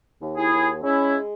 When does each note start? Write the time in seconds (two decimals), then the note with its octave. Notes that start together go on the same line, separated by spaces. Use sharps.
0.21 D#2
0.37 E4 G#4
0.52 D#2
0.83 G#3 C#4 E4